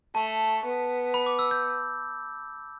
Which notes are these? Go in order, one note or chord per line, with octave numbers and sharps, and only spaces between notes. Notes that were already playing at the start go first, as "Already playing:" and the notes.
A3 A5
B3
B5
D6
E6
G6